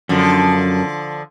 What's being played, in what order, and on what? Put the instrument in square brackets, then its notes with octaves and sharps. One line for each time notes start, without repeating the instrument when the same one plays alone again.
[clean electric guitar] F#2 [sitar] D3 F3